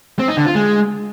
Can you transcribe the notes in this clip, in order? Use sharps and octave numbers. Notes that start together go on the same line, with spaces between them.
C4
D#4
D3
F4
G#3